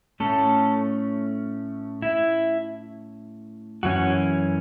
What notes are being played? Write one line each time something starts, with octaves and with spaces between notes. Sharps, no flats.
A2 A3 C#4 A4
E4
F#2 E3 C#4 F#4